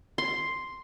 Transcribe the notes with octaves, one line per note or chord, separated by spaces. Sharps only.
C6